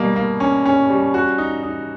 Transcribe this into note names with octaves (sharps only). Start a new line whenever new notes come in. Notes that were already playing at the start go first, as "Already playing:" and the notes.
Already playing: B2 G3 A#3
A#3
C#4
C#4
G3
F#4
D#4
D#4